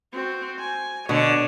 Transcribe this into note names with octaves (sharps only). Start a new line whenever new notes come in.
C4 F#4
G#5
B2 D3 C#5